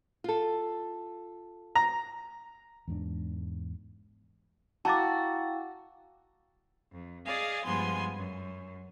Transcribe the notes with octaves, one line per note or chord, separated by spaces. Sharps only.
F4 A4
A#5
E2 G#2 D4
E4 F#4 F5 G5 A5 A#5 D6 A6
F2
G#4 D5 D#5 F5 G#5
G2 F3 G#3 B3 G#5 C6
F#2